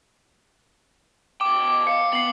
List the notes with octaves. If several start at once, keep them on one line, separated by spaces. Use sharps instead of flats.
B2 G5 D6
F5 C#7
B3 C7 F#7